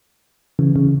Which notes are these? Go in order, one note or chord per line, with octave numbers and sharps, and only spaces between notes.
C#3 E3
C#3